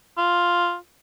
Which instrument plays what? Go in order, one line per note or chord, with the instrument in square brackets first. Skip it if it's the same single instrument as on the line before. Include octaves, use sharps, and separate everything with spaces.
[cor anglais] F4